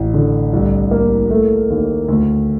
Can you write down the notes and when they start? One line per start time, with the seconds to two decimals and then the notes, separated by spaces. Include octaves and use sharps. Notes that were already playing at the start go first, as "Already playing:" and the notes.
Already playing: A1
0.14 D3
0.53 C2
0.91 A#3
1.30 A3
1.70 D#2
2.08 D2